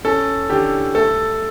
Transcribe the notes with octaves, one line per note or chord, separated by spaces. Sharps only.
C#4 A4
D3 G4
A3 A4